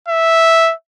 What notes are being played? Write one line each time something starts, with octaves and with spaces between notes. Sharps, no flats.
E5